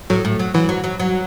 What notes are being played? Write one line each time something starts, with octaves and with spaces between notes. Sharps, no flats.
A2 F#3
A2
F#3
E3 F#3
F#3
F#3
F#3